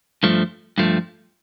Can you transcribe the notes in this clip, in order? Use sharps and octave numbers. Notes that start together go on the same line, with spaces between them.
G2 F3 A3
G2 F3 A3